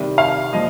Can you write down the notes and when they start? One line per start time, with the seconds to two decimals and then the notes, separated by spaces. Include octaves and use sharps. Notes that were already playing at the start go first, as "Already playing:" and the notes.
Already playing: C3 D#3 G3
0.18 F5
0.53 A#2 F3 D#5